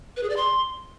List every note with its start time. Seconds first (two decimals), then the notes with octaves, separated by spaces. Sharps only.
0.17 B4
0.23 G#4
0.30 D5
0.36 C6